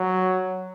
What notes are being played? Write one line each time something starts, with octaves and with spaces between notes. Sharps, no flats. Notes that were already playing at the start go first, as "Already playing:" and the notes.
Already playing: F#3